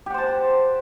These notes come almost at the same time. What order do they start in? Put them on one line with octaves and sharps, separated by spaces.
G4 F#5 C5 A5